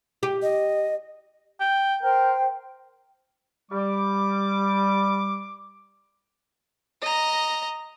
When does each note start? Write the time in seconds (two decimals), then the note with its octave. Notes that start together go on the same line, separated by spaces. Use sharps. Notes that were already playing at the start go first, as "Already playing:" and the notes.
0.23 G4
0.42 D#5
1.60 G5
2.03 A#4 C5 G5
3.71 G3 D6
7.02 D#5 A#5